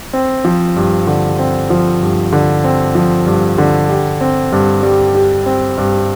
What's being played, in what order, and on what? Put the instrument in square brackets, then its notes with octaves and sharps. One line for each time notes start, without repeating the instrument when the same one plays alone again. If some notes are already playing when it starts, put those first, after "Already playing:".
[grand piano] C4
F3
G2
D3
C4
F3
G2
D3
C4
F3
G2
D3
G4
C4
G2
G3
G4
C4
G2